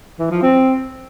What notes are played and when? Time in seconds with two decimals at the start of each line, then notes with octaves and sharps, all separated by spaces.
0.19 E3
0.31 F3
0.42 C4